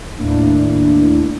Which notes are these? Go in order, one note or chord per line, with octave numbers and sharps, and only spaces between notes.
D#2 A2 A#3 D4 E4